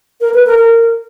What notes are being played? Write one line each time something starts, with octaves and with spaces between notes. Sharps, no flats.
A#4
B4
A#4
A#4